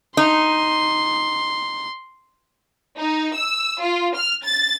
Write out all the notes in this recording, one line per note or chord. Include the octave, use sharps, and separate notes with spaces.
D#4 C6
D#4
E6
F4
F6
A6